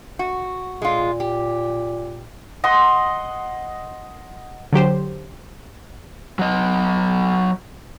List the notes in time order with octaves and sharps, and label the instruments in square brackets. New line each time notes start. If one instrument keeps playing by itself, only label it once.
[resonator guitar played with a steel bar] F#4
[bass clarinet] A#2 [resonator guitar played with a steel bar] G#3 F4
[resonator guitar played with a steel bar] G4
[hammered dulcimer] D#5 F#5 C6
[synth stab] D3 F#3 G4 C5
[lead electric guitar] F#3 D#5